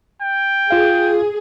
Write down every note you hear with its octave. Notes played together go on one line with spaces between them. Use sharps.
G5
F4 G#4 F5